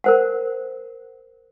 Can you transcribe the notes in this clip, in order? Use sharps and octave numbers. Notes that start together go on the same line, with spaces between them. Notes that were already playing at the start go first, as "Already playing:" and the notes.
A#4 C5 F#5